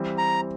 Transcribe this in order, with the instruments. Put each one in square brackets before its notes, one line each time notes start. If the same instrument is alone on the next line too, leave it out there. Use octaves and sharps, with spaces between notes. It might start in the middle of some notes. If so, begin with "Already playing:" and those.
Already playing: [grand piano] E3 G3 C4
[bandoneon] A#5